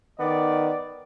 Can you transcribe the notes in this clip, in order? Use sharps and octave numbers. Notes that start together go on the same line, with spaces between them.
D#3 B3 D5